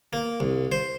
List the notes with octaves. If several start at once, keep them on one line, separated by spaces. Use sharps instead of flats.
A#3
C2
C5